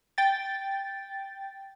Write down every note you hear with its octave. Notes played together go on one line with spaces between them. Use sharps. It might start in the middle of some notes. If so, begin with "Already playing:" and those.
G5 A6